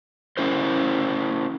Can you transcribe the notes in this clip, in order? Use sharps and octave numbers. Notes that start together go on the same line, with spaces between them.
C#4 E4 A#4 C5